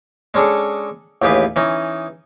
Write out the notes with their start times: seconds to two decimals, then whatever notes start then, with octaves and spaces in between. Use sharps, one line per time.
0.34 G#3 C#4 D4 G#4 A4 C#5
1.22 A1 D#2 G4 G#4 B4
1.56 E3 C#4 D#4